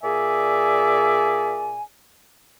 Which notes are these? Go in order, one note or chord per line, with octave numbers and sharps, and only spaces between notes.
A#2 G#4 D5 E5 G#5